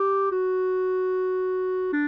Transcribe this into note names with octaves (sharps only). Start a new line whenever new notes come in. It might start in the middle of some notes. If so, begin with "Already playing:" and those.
Already playing: G4
F#4
D4